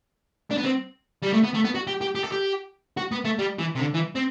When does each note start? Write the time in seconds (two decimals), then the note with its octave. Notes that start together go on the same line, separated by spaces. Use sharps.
0.51 D4
0.58 B3
0.65 C4
1.22 G3
1.33 A3
1.43 B3
1.54 A3
1.64 B3
1.75 F#4
1.87 G4
2.01 G4
2.15 G4
2.24 A4
2.32 G4
2.97 F#4
3.12 B3
3.25 A3
3.39 G3
3.59 E3
3.75 C3
3.79 D3
3.94 E3
4.15 C4